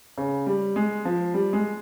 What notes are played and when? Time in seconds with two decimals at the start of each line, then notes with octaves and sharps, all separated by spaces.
0.18 C#3
0.47 G3
0.76 G#3
1.05 F3
1.34 G3
1.53 G#3